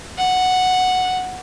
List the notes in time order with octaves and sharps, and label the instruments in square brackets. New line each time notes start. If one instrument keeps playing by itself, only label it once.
[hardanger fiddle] F#5